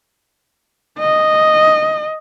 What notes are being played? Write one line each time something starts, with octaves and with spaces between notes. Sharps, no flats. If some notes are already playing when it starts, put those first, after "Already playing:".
D#5